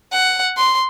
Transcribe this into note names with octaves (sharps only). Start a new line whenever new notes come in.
F#5
C6